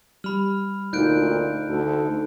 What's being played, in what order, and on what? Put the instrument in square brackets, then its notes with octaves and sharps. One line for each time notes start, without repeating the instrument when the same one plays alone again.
[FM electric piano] G3 [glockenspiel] B5 F6
[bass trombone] D2 [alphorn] A#2 [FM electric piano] D#4 [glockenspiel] F#6 G6 D7
[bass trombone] D2 [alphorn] A4